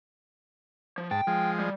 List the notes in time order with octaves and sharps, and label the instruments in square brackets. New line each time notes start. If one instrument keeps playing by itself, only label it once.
[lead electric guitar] F3
[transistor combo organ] G#2 A5 [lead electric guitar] G5
[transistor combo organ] F3 G#3
[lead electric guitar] G3